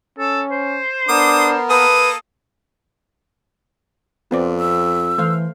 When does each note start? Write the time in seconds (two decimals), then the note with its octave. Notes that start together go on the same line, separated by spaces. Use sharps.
0.19 C#4 A4
0.51 C5
1.09 B3 D4 A#4 D6 D#6
1.70 A#3 A4 B4 D#6
4.31 F2 B3 C4 D5
4.60 E6
5.18 E3 A3 C5 F5